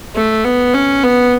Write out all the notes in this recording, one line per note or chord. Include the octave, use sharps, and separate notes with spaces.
A3
B3
C#4
B3